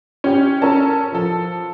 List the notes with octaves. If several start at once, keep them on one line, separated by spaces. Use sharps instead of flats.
C#4 G4
C#4 A4 A#4 A5
F3 A4